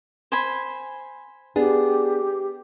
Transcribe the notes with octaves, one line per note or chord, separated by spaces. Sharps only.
C5 G#5 B5
B3 D4 G4 G#4